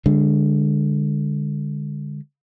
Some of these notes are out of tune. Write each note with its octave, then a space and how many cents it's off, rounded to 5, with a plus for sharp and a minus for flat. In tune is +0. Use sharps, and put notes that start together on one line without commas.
D3 +0 G#3 -25